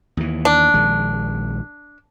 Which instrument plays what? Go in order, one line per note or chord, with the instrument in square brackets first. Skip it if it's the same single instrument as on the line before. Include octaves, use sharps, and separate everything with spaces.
[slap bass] D#2 E3
[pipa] D4
[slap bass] A#1 D#3 G#3